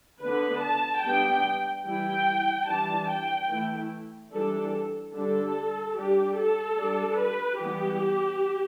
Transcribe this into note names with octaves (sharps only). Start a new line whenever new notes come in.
D3 B3 D4 B4
A5
G3 B3 D4 G5
E3 G3 E4 G5
E3 G3 D4 A5
G5
E3 A3 E4
E3 G3 D4 A4
D3 G3 D4 A4
G3 D4 G4
A4
G3 D4
B4
E3 G3 B3 G4